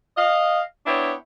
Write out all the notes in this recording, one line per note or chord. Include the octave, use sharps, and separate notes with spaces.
D#5 F5
B3 D4 E4 C#5 G5